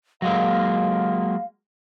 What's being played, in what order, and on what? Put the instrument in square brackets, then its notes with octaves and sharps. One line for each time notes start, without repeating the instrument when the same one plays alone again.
[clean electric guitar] F#3 G#3 A#3 [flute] F5